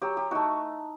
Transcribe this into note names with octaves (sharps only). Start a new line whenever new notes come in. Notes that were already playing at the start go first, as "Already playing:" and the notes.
F#3 G4
G4
A3 D#4 F#4